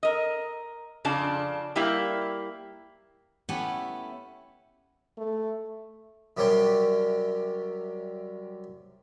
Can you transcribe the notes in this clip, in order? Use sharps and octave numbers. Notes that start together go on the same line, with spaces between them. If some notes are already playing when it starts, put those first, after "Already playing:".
A#4 D#5
F2 C#3 D4 F4 A5
G3 A#3 E4 G4 F5
A3 B3 C#4 E4 G4 A4
A3
F#2 C3 G3 C#4 C5 G5